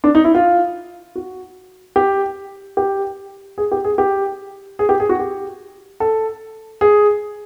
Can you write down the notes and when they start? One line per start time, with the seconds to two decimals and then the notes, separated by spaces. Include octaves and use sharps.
0.04 D4
0.15 D#4
0.24 E4
0.35 F4
1.15 F#4
1.96 G4
2.77 G4
3.58 G#4
3.72 G4
3.85 G#4
3.98 G4
4.79 G#4
4.89 G4
5.00 G#4
5.09 F#4
5.19 G4
6.00 A4
6.81 G#4